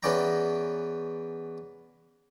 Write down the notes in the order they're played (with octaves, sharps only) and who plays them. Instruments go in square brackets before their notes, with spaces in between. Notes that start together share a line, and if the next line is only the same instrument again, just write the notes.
[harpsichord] E2 B3 C#4 D5 G5 A#5